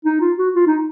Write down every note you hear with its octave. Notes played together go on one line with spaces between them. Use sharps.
D#4
F4
F#4
F4
D#4